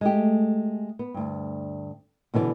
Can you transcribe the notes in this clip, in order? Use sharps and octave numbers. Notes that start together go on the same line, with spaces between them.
G#3 A3 G4
B3
D2 G2
B2 D3 E3 C#5 D5